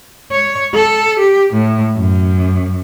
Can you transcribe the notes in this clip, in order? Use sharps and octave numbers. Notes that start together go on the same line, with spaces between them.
C#5
A4
G4
A2
F#2